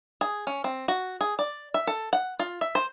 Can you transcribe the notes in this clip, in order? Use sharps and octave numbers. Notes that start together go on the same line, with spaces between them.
G#4
C#4
C4
F#4
G#4
D5
E5
A4
F#5
F4
E5
C5